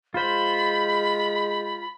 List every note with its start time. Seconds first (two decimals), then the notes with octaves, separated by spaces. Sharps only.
0.14 G#3 F4 C5 B5